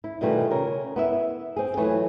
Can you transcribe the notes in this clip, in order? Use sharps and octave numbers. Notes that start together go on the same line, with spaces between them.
E4
B2 D#3 E3 G3 A3 F4
C#3 A#4
B3 E4 E5
C4 G#4
E3 F#3 A3 F4 B4 C#5